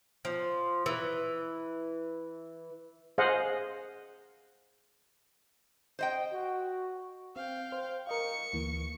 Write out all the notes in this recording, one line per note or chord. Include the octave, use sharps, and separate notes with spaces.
F3
E3
G#4 C5 D#5 F5 F#5
C5 D#5 G5
F#4
C4 F5 G5
C5
A#4 D#5 F5 C#6 C#7
D2 E3 A#3